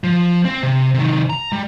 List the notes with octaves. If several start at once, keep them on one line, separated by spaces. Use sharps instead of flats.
F3
C4
C3
C3 D#3
A#5
G3